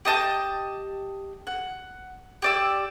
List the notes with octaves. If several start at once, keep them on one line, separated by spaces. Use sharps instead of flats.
G4 D#5 A5 G6
F#5
G4 D5 E6